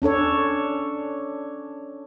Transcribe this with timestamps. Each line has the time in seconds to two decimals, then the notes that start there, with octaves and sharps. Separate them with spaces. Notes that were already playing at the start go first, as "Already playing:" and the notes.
0.02 C#4 D4 A4 C#5